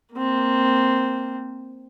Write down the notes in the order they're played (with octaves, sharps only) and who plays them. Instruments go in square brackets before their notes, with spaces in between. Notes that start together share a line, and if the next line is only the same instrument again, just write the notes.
[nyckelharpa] A#3 C4